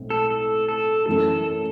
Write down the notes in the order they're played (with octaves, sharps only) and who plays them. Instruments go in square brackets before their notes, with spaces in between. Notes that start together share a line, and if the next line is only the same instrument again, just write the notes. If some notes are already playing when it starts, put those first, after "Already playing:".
Already playing: [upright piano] B1 A2 C4
[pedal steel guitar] A4
A4
A4
[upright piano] F#2 E3 A3 [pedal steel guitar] A4